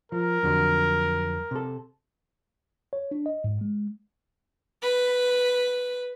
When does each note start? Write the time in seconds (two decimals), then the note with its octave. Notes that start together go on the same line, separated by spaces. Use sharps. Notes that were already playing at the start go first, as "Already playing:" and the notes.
0.12 F3 A#4
0.43 F2 D3 F#3
1.51 C3 A4
2.93 C#5
3.11 D4
3.26 D#5
3.44 G#2
3.61 G#3
4.83 B4